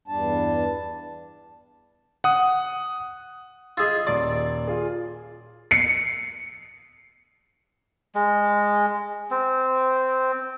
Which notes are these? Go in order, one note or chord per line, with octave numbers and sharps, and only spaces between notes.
E2 G2 G3 D4 A5
F#5 D#6
F4 G#4 D#5 E6
D#1 D5 C6
F4 G#4
C7 C#7
G#3
C4